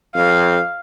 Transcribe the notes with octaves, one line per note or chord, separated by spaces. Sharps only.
F2 F5